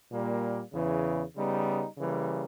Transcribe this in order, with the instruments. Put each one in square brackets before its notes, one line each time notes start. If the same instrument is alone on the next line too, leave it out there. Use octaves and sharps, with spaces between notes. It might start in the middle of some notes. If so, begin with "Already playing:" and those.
[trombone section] A#2 G3 A#3
E2 C#3 E3
C#3 G3 B3 D#4
C#3 E3 G3 A#3